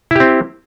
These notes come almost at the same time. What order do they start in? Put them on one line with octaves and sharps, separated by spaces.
E4 G4 C4